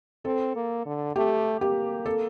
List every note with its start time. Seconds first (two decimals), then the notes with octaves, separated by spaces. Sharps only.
0.25 C4 A4
0.56 A#3
0.86 D3
1.16 A3 G4
1.61 A#3 G4
2.06 A4